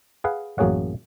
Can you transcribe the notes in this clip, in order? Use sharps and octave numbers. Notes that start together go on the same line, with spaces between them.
G#4 B4 F5 F#5
A1 F#2 A#3 G#4 C#5 F#5